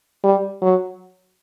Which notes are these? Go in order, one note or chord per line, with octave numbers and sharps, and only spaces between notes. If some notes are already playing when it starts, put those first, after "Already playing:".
G3
F#3